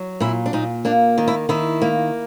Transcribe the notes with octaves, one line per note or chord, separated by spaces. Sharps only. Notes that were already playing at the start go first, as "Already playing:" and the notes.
Already playing: F#3
A#2 E4
D4
A#2 D#4
A#3 D4
D#3
E4
D#3 E4
A#3